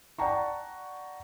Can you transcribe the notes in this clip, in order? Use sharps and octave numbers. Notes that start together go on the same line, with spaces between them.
D5 F#5 G5 A5 A#5 C#6